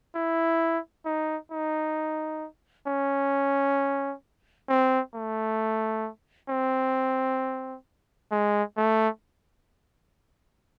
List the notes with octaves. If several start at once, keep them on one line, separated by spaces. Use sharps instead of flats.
E4
D#4
D#4
C#4
C4
A3
C4
G#3
A3